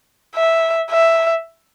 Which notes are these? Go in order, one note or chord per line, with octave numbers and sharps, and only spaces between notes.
E5
E5